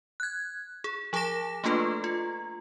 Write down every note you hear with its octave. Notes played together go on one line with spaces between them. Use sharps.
F#6 G#6
G#4
F3 G#4 A5 D6 A#6 E7
A3 A#3 D4 F4 A4 B4
F4